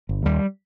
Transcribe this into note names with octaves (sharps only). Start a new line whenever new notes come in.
G1
D#2 G3